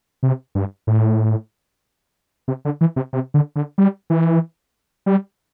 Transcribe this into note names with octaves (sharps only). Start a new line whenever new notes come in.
C3
G2
A2
C3
D3
E3
C3
C3
D3
D3
G3
E3
G3